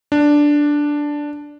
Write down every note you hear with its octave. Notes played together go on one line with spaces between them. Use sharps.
D4